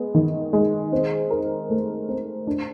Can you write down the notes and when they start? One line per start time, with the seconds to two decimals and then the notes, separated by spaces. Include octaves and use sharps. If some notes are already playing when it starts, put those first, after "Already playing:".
Already playing: G#3 B3
0.15 D#3
0.53 G#3
0.92 C4
1.31 A#4
1.70 A3
2.09 C4
2.47 D4